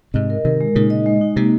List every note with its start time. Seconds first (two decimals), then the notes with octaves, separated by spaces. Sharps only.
0.14 G#2 C3 D#5
0.30 A#4
0.45 C3 D#3 A#4
0.61 G#3
0.76 A#2 C#3 D#4
0.90 D#5
1.06 G#3
1.21 D#4
1.36 C3 A#3